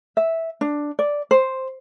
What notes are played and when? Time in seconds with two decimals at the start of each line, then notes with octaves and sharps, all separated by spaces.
0.17 E5
0.61 D4
0.99 D5
1.31 C5